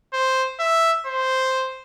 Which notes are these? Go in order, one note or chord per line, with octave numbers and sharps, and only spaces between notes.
C5
E5
C5